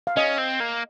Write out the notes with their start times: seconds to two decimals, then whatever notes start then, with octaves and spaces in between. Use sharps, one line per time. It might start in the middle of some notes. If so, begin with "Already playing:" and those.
0.07 F5
0.17 C#4 D#5
0.39 C4
0.60 A#3